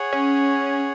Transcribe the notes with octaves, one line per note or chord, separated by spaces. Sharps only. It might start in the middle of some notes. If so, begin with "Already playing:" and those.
Already playing: G#4 C#5 F#5
C#4